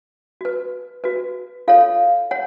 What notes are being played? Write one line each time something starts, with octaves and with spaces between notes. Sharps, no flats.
F#4 B4
F#4 B4
F4 A4 C#5 F5
C#5 F#5